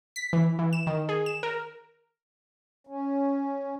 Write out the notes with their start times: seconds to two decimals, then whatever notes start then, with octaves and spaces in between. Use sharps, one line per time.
0.16 B6
0.33 E3
0.59 E3
0.73 E7
0.87 D#3
1.09 G#4
1.26 E7
1.43 A#4
2.87 C#4